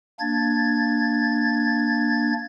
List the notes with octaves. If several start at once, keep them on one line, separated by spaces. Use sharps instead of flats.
A#3 D4 G#6 A6